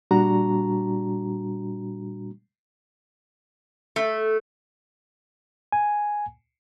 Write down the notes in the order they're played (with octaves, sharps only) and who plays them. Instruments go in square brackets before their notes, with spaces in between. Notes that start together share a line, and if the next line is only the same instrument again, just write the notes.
[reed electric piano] A#2 G3 D4 F#4 A#5
[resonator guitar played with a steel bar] A3
[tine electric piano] G#5